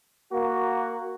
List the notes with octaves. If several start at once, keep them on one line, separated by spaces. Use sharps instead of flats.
A#3 F#4